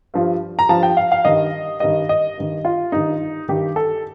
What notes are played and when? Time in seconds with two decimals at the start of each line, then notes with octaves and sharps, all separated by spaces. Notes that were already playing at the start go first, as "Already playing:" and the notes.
0.14 G2 F3
0.59 A#5
0.69 G2 F3 A5
0.83 G5
0.97 F5
1.12 F5
1.25 G2 D#3 D#5
1.80 G2 D#3 D#5
2.09 D#5
2.37 G2 D#3
2.65 F4
2.92 G2 D#3 D#4
3.49 G2 D#3 G4
3.76 A4